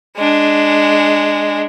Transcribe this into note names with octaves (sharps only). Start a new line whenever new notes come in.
G#3 D4